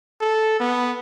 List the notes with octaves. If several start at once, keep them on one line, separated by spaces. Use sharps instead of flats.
A4
B3